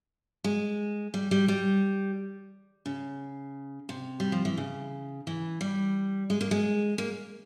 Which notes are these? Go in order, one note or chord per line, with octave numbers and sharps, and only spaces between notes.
G#3
G3
G3
G3
C#3
C3
G3
F3
E3
C#3
E3
G3
G#3
A#3
G#3
A#3